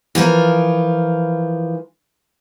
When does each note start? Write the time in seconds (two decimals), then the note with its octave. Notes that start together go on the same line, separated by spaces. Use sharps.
0.15 E3 F3 F4 A#4